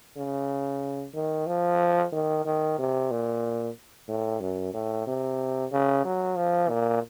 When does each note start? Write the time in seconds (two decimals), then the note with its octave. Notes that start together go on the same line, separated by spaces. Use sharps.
0.17 C#3
1.14 D#3
1.47 F3
2.12 D#3
2.46 D#3
2.79 C3
3.11 A#2
4.09 A2
4.41 F#2
4.74 A2
5.07 C3
5.72 C#3
6.05 F#3
6.37 F3
6.70 A#2